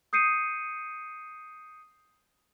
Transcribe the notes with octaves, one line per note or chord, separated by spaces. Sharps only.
D#6 G6 C7 C#7 D#7